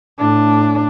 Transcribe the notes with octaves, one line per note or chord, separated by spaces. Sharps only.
A2 D4